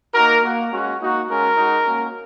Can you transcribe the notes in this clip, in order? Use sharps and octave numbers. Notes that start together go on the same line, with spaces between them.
A#3 D#4 F#4 A#4
A#3 F#4
G#3 C#4 F#4
A#3 D#4 F#4
G#3 C#4 F#4 A#4
G#3 D#4 F#4
A#3 C#4 F#4